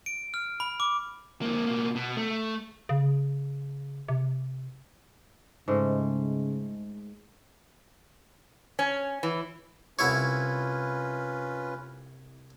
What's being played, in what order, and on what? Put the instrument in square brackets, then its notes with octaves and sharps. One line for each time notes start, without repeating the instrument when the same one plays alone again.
[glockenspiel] D7
F6
B5
D6
[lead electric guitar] F2 A#3
B2 A#3
B2
A3
[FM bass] C#3
C3
[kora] G#2 G#3 A3 [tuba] C#3
[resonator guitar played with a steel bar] C#4
E3
[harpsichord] C2 E4 C#5 [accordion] C#4 F4 B4